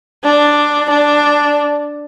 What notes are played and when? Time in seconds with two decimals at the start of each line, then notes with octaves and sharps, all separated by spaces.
0.25 D4
0.90 D4